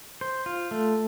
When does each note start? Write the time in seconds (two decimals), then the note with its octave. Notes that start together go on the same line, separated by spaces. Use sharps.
0.21 C5
0.46 F4
0.71 A3